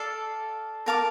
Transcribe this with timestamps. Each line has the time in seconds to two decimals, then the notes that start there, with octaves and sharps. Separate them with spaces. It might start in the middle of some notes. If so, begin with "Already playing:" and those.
Already playing: A4 D5 F5
0.86 A#4 F5 A5 D6